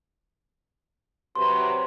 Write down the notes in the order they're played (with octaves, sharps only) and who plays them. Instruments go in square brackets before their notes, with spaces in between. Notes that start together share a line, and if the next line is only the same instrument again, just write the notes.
[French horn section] C3 F#3 B4 [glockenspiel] C6